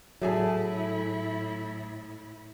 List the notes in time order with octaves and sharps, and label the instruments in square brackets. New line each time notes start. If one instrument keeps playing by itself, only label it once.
[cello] A2 E4 [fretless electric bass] F#3 [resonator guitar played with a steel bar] A3 G#4 G#5